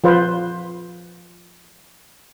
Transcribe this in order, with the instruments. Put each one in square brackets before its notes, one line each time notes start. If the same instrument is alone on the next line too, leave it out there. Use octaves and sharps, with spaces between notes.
[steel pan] F3 F4 B4 C5